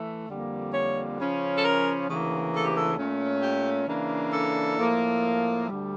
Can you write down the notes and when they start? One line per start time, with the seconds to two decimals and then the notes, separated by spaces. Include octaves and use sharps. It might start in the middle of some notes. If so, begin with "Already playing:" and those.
Already playing: E3 A3
0.29 F2 D3 G3 A#3
0.73 C#5
1.19 C#3 F3 C#4
1.56 A4
1.63 A#4
2.08 D2 C#3 E3 A#3
2.54 A4
2.64 G4
2.75 A4
2.98 A#2 A3 C#4
3.42 G4
3.87 C#3 E3 A#3 D4
4.33 A4
4.77 A2 F3 A#3
5.68 D2 D3 G3